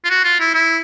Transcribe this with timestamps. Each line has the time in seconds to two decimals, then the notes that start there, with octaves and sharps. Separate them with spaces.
0.05 F4
0.10 F#4
0.24 F4
0.40 E4
0.54 E4